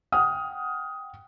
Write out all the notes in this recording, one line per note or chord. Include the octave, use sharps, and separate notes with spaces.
F#5 G5 D#6 F6